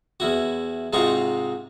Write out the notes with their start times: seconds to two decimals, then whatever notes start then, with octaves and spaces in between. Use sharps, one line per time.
0.20 E2 E4 F#4
0.93 G#2 C3 D#4 F4 F#4 C#6